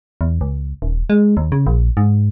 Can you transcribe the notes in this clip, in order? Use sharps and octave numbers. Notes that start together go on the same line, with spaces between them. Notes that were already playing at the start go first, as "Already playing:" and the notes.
E2
C#2
D#1
G#3
D#2
C#3
A#1
G#2